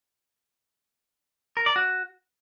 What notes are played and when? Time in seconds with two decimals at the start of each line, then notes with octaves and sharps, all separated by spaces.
1.57 A#4
1.66 D5
1.76 F#4